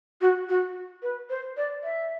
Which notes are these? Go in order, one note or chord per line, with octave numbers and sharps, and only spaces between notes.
F#4
F#4
B4
C5
D5
E5